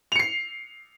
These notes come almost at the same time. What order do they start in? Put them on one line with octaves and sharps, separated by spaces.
F7 C#7 C7